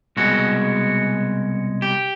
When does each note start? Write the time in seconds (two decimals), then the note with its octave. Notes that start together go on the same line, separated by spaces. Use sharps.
0.17 C2 B2 G#3 F#4
1.82 G4